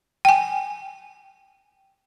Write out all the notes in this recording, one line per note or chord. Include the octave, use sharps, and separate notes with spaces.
G5 G#5